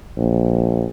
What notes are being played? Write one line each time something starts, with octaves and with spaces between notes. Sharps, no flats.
A#1